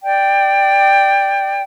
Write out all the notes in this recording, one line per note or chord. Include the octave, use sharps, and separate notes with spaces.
D5 G5